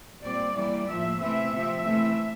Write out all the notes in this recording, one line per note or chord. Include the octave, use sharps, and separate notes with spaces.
A#2 G3 C4 D5
E3 G3 A#3 D5
A2 F3 A#3 E5
C3 E3 A3 C4 E5
C3 F3 C4
C3 E3 A3 C4